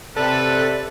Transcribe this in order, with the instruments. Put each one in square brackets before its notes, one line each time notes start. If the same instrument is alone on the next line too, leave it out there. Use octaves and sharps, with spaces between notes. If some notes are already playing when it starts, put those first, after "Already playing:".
[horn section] C3 [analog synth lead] A4 [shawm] B4 [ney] D5